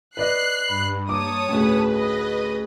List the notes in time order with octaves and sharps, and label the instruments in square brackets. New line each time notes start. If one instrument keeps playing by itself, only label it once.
[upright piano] B4 D5 D#5 [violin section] F#6 C7
[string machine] G2 [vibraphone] B5
[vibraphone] A#3 [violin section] C#5 A5 D#6 [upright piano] D6
[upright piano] A1 D2 [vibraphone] A3 G#4 [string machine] B4
[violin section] D#5